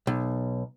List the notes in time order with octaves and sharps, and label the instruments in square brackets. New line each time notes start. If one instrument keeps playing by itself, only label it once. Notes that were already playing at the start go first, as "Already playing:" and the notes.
[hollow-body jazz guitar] B1